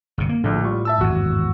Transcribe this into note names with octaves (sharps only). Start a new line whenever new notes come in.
G1 C3
A#3
A#1 A2 D3
G3 F4 C#6
E5 A5 E6
G#1 E2 G2 F#4